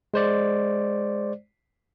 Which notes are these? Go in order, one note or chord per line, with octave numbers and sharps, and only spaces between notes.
G#3 C5 D5